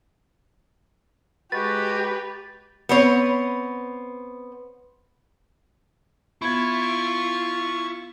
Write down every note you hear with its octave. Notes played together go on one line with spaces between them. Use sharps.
G#3 F#4 G4 B4 A6
B3 C4 C#5
B3 E4 F4 C#6 G#6